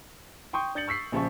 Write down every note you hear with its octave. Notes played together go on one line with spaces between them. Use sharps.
G5 C6 C#6 D#6 G6
D4 G6 A6 C#7 F#7
C#6 E6 B6 C7
A#1 C#3 F3 C#6